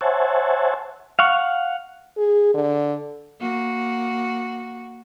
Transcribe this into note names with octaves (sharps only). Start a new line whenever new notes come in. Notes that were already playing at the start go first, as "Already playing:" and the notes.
C5 C#5 E5 F#5 G#5 A5
F5 F#5 C#6
G#4
D3
A#3 F#4